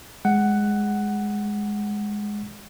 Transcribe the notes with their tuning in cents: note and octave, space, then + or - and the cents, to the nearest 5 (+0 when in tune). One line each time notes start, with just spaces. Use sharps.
G#3 +0 F#5 +10